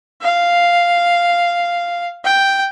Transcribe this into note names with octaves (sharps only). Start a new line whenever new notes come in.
F5
G5